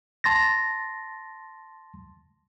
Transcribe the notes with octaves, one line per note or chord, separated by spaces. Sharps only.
A5 C6 A6 A#6